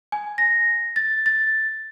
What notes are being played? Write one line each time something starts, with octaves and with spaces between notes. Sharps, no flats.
G#5
A#6
A6
A6